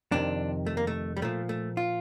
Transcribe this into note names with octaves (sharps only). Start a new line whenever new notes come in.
F2 C3 D#3 D4
A3
A#3
A3
G3
A#2 F3 A3
A3
F4